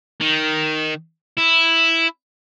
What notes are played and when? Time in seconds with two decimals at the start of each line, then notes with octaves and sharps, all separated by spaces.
0.21 D#3
1.38 E4